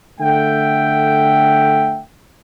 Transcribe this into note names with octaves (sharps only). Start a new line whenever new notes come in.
D3 A3 E5 F#5 G5